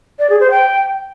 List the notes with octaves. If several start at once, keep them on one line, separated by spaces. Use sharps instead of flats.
D5
G#4
C5
G5